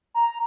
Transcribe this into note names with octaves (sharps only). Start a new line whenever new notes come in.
A#5